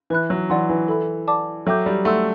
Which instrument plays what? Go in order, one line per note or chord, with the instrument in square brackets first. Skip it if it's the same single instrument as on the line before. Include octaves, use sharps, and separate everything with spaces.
[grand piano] E3 [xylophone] B4 E5 B5 F#6
[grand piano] F#3
[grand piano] E3 [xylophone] B4 D5 F#5 C6
[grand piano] E3
[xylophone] A4 E5 B5
D5 F#5 A5 D6
[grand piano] F#3 [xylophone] A4 E5 G5 D6 G6
[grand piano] G3
[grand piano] A3 [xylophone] F#5 C6 E6